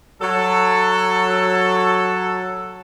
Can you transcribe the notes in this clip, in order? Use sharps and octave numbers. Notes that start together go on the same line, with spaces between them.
F#3 A4